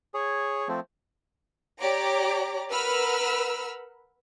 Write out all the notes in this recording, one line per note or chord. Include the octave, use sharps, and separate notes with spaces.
G#4 C#5
F3 A3 C4
G4 C#5 D5 A#5 D6
A#4 B4 F#5 B5 E6 F6